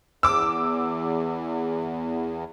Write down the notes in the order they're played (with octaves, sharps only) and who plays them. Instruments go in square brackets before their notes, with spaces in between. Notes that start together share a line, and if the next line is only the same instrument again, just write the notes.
[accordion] E2 [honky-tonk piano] D6 E6